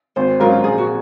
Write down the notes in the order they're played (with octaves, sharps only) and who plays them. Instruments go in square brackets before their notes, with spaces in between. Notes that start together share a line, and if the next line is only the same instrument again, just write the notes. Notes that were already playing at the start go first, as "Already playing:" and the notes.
[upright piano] G#1 [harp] C5
[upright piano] G#2 F#3 C#4 F4 [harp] A#4
[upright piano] A#1 [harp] G#4
[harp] F#4